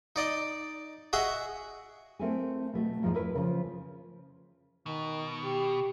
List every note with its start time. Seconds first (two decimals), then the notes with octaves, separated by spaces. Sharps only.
0.16 D#4 D5 D#5
1.13 F#4 G#4 D#5 E5 F#5
2.19 A3 C4 E4 A4 A#4 G#5
2.73 B2 A3 F#4
3.02 E2 G#2 F3 F#3 G#3 G#4
3.14 E4 A#4 B4 C#5
3.35 C#3 F3
4.86 B2 D#3
5.44 G4